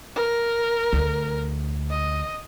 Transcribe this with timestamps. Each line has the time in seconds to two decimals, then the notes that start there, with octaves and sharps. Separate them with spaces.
0.15 A#4
0.93 D2
1.90 D#5